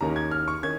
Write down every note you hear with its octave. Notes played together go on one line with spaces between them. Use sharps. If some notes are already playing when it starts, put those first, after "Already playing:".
D#2 D#3 A#3 C#4 A#5
G#6
F6
C#6
D#3 C#4 G#6